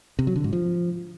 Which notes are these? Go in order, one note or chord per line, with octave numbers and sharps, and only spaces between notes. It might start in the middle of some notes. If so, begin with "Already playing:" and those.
C3
F#3
D3
G#2
F3